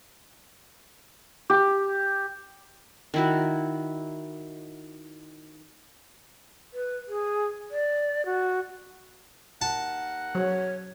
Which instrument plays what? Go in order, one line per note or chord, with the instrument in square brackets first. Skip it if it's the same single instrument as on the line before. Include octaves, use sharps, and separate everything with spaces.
[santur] G4
[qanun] D#3 E4 F#4
[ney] B4
G#4
D5
F#4
[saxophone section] D#2 A#4 F#5 [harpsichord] A5
[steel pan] F#3 [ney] C#5